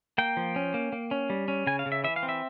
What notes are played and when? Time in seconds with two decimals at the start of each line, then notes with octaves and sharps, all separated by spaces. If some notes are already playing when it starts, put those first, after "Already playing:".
0.18 A#3 G5
0.37 F3
0.56 C#4
0.74 A#3
0.93 A#3
1.11 C#4
1.30 G3
1.48 C#4
1.67 C#3 G#5
1.79 F5
1.86 C#3
1.92 E5
2.04 E3 E5
2.16 F5
2.23 C4
2.29 E5